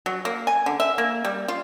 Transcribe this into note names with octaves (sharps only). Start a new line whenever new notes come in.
F#3
A#3
G#5
D3
E5
A#3
G3
F4